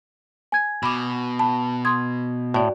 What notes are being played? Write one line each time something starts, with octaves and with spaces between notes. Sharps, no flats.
G#5 G#6
B2 B5 D6
A5 B5
C6 D#6 G#6
A2 F#4 D5